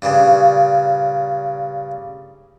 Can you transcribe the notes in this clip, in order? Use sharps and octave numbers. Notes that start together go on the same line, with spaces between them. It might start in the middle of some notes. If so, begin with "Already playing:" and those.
G2 A#2 C#3